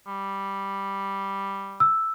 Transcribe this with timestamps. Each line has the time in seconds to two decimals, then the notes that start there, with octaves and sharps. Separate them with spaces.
0.07 G3
1.80 E6